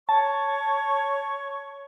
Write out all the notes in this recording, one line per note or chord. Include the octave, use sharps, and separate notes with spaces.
C#5 A5 C#6